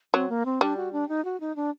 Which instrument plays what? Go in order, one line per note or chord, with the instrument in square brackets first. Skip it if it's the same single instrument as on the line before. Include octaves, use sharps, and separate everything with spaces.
[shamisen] F#3 [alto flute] C4
[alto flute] A#3
C4
[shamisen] G3 [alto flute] D4
[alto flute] F#4
D4
D#4
F#4
D#4
D4